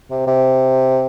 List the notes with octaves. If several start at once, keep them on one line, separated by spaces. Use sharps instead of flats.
C3
C3